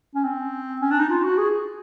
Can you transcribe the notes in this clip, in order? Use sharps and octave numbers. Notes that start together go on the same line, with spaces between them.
C#4
C4
C#4
D4
D#4
F4
F#4
G#4